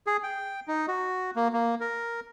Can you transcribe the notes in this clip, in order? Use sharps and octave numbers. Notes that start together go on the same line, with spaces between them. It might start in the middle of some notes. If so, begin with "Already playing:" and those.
G#4
G5
D#4
F#4
A#3
A#3
A#4